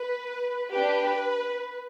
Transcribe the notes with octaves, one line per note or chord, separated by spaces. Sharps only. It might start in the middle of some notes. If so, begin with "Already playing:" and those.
Already playing: B4
D4 G4 B4